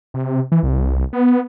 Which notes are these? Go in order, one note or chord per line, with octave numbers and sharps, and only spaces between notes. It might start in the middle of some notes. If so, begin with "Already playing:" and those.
C3
E3
C2
B3